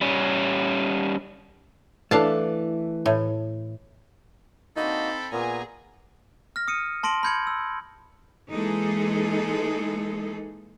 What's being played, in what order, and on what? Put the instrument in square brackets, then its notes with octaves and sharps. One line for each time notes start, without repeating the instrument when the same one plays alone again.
[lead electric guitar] G3 C#4
[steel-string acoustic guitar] E3 [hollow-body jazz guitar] A3 A4 [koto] D4 F5 A5
[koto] A2
[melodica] A#3 D4 F#4 [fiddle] C4 B5 [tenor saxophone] D#4 [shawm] A4
[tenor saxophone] A#2 [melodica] B3 A#5 [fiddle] G#4 G#5
[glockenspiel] F6 A#6
D#6 C#7 D#7
A5 C6 A#6 D7 F#7
B5 F6 G6 G#6 C#7 F#7
E6
[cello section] E3 G#3 A#3 D#4 G#4 A4